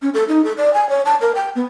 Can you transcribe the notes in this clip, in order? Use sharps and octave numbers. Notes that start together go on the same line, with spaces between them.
C#4
A4
D#4
A4
D5
G#5
C#5
A5
A#4
G5
B3